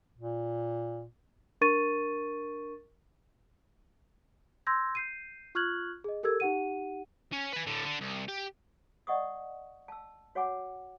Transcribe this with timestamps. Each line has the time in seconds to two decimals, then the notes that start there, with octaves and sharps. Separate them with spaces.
0.18 A#2
1.61 D4 A#4 C#6 A6 D#7
4.67 C6 E6 G6 G#6 A#6
4.95 G6 C7 D#7
5.55 F4 C#6 F6 F#6 G#6 F#7
6.04 G#4 D#5
6.23 G4 A4 A#4 E6 G#6
6.40 D#4 G4 F#5 D#7
7.33 C#4
7.53 B4 G#5
7.66 A2 D3
7.85 D3
8.01 C2
8.29 G4
9.07 D5 D#5 F#5 C#6 D#6
9.88 A5 E6
10.35 F#4 C#5 F#5 G#5 D6